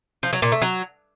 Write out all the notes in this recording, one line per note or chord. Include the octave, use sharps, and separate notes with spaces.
F3
F#3
A#2
A3
F#3